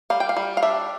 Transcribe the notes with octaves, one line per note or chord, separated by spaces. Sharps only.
G3 F5
G5
F5
G3
F5
D4 E5